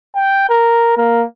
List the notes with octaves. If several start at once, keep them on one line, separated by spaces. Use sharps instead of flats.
G5
A#4
A#3